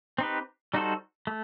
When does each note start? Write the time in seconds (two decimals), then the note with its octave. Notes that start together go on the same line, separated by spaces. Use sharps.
0.18 C4 D#4 G4 B4
0.74 G3 D#4 F#4 A4 C5
1.27 A3